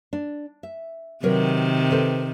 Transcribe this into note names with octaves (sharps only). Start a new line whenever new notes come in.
D4
E5
C3 D#3 F#3 A#4 B4
A4 B4 C5